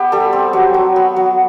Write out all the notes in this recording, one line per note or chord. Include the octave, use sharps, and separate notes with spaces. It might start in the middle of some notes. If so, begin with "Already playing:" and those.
Already playing: B3 G4
G3 A4
C4
F#3
F#3
B3
F#3